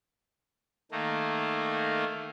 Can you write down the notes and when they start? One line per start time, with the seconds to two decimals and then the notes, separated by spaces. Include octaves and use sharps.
0.91 D#3 A3 A#3